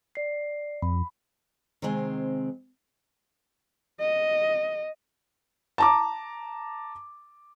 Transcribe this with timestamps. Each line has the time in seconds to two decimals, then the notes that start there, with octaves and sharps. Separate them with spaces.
0.15 D5 C7
0.82 F2 B5
1.82 C3 D#3 G#3 C4 G#5
4.00 D#5
5.78 A5 A#5 D6